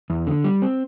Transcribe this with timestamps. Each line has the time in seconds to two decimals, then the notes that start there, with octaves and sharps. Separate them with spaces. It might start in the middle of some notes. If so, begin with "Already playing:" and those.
0.10 E2
0.27 D3
0.44 G3
0.62 C4